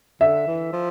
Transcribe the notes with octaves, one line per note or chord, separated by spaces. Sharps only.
D3 E5
E3
F3